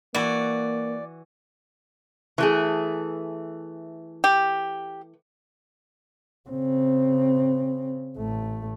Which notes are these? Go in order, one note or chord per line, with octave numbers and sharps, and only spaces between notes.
E3 A#3 F#4 D5
E3 A3 G#4
G4
C#3 C4
A1 A3